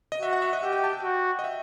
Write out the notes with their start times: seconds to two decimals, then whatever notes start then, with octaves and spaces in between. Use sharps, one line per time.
0.12 D#5
0.22 F#4 E5
0.33 F#5
0.42 E5
0.53 D#5
0.63 G4 E5
0.73 G5
0.84 A5
0.93 G5
1.03 F#4
1.39 D#5
1.44 E5